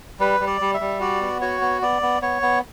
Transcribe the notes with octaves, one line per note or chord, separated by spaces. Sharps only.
G3 B4
G3
D5
G3
E5
G3
F#4 D5
B3
F#4 C#5
B3
B3 D5
B3
B3 C#5
B3